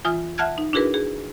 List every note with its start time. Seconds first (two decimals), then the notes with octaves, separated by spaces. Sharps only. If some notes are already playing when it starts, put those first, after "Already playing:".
0.05 E3 F4 G#5 D#6 F6
0.38 E5 F#5 A5 F6 F#6 G#6
0.58 D#4
0.73 D4 E4 F#4 G#4 A#4 B4
0.94 G#4